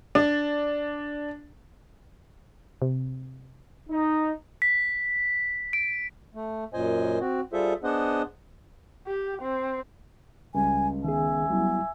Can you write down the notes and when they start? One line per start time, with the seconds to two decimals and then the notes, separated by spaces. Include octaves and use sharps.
0.15 D4
2.82 C3
3.89 D#4
4.62 B6
5.73 D7
6.35 A3
6.73 F#2 A#2 C5 D#5 G#5
7.20 C4 F#4
7.53 G3 F4 G#4 A4 C5 E5
7.84 B3 D4 G#4 C5 D#5 F#5
9.06 G4
9.41 C4
10.55 C#2 G3 G#5
11.05 D#3 B3 G#4 E5 G#5
11.50 F#3 G3 B3 E4